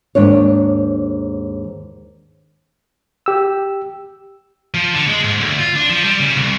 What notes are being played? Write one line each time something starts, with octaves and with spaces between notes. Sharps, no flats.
D#2 G#2 D4 C#5
G4 E6
F3
D3
G#3
G#2
D2
F4
D4
F3
G3
C#3
C2